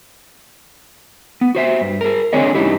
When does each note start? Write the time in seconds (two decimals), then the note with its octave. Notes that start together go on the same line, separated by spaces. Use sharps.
1.41 B3
1.55 F#4 C5 E5
1.81 G2
2.01 G#4 A#4
2.33 D3 C4 D4 G#4 C#5 D#5
2.55 G2 D#3 C#4 D#4 E4 G4